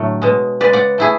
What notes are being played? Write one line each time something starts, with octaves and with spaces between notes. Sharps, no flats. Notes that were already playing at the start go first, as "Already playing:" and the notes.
Already playing: A2 D3 F#3 A3
B2 G#3
C#3 G#3 B4 D5
D5 F#5
A3 E4 G#4